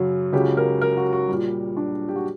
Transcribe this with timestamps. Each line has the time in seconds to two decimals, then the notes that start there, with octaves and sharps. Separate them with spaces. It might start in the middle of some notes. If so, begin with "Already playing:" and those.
Already playing: F#2 C#3 F#3
0.33 C#2 C#3 F#3 G4
0.57 A#4
0.81 A#4
0.97 F#4
1.13 F#4
1.28 A#2 G3
1.77 D4
2.09 G4
2.16 F#4